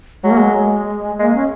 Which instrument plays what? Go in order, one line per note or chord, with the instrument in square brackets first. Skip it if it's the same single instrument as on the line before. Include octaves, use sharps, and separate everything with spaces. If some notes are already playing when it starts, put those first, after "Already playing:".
[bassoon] F#3 [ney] G#3
[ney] A#3
G#3
[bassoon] G#3 [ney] A#3
[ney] C#4